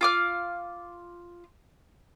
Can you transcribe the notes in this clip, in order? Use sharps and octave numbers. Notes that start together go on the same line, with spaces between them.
F4 D6 F6